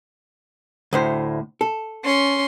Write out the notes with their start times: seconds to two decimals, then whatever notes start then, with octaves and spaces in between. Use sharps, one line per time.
0.93 D2 A2 C5
1.61 A4
2.03 C#4 C6